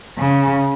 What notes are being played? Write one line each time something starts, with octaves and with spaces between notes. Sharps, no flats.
C#3